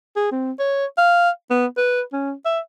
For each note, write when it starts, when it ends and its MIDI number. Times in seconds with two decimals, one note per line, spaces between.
0.16 0.29 68
0.32 0.52 60
0.59 0.86 73
0.98 1.30 77
1.50 1.66 59
1.77 2.02 71
2.13 2.33 61
2.45 2.59 76